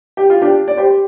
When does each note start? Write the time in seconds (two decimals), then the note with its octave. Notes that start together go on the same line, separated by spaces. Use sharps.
0.17 G4
0.30 F4
0.42 D4 G4
0.68 D5
0.77 G4 C5